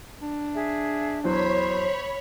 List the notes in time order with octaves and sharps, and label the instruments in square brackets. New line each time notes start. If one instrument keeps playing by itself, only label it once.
[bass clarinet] D4
[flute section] G#4 E5
[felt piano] E2 F#3 [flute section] C5 [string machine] C#5 B5